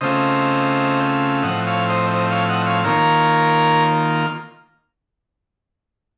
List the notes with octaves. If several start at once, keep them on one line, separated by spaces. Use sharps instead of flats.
C#3 A3 C4 F4 C5 D#5
A2 F3 C4 D#5 F#5
C#5 F5
C5 D#5
C5 D#5
C#5 F5
D#5 F#5
C#5 F5
D#3 A#3 F4 A#4 C#5